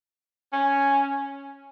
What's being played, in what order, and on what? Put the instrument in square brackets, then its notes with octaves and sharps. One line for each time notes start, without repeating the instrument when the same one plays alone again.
[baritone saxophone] C#4